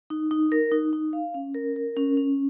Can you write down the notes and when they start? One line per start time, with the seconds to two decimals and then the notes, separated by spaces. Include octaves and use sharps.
0.10 D#4
0.31 D#4
0.52 A#4
0.72 D#4
0.93 D#4
1.13 F5
1.34 C#4
1.54 A#4
1.76 A#4
1.97 C#4
2.17 C#4